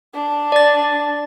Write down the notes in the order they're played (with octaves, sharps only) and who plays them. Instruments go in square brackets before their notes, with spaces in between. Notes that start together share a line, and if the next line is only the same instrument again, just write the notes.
[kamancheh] D4
[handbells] D5 A6